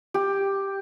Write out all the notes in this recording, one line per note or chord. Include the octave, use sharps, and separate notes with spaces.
G4